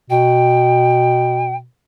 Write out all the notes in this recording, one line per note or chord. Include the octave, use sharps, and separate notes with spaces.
B2 G5